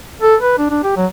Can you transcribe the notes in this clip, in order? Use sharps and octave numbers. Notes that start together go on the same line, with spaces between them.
A4
B4
D4
D4
G4
F#3